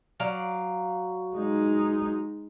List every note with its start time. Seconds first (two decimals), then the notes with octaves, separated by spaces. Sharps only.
0.20 F#3 D5 F5
1.35 G#3 D#4